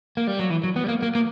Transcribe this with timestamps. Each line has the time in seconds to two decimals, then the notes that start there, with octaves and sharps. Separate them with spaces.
0.17 A#3
0.27 G3
0.39 F#3
0.50 E3
0.64 F#3
0.76 B3
0.84 G3
0.88 A#3
1.03 A#3
1.15 A#3